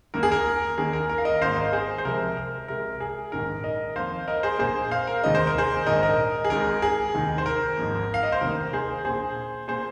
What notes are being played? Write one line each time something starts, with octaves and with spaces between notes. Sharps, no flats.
D#2 D#3 A#3 A#4
G#4
A#4
D#2 D#3 A#3 G#4
A#4
A#4
F5
A#4 D#5
G#1 G#2 D#3 A#3 C5 F5
A#4 D#5
G#4 C5
C5
C2 C3 F3 G#3 A#4
A#4
C2 C3 G#3 A#4
G#4
A#1 G#2 D#3 A#4
A#4 D#5
F2 D#3 A#3 C5 F5
A#4 D#5
G#4 C5
A#1 A#2 A#3 G#4 C5
C5 F5
A#4
F1 D#2 D#3 G#3 D#5
C5
A#4
G#4 C5
A#1 G#2 D#3 A#4 D#5
A#4 D#5
G#4
G#1 G#2 G#3 A#4
G#4
F1 D#2 D#3
C5
A#4
G#1 G#2 F3 A#3
F5
D#5
C5
F1 D#2 D#3 A#3 A#4
G#4 C5
A#1 A#2 A#3 G#4 C5
A#2 A#3 G#4 C5